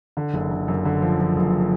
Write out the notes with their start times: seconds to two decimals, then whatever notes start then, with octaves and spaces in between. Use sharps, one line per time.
0.17 D3
0.34 F#1
0.51 D3
0.68 F#2
0.85 D3
1.02 F3
1.20 F3
1.36 F#1